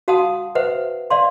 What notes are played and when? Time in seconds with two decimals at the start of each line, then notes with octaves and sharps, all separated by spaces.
0.08 F#4 F5 F#5 A5 D#6
0.55 B4 C5 E5 F#5
1.10 D5 F5 C6